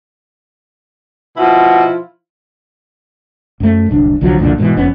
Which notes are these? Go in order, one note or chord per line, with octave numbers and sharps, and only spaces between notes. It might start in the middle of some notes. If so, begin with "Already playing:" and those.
B2 F3 E4 F4
F#2 A3
D1 C2 D4
C2 D3 F3 F#3
C2 F2 A#2 D3
G#2 B2 D3 E3
F#1 F2 B3 C#4